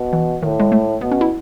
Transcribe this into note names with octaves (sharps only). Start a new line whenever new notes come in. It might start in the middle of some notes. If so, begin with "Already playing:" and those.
Already playing: B2
E3
A2 D#3
G#3
A3
B2 B3
C#4
E4